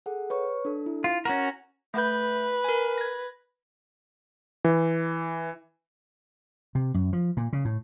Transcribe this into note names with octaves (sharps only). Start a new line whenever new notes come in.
G#4 A4 F#5
B4 C#5 C#6
D4 A4
E4
F4
C#4 F#4 A#4 F#5 G#5
A3 B4 G6
A#4 G#5
G#6 A#6
E3
C3
F#2
F3
A#2
C#3
A2